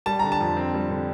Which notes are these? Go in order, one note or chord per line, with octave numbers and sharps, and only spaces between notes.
G3 A5
D3 A#5
A5
F2
C4
G3
D3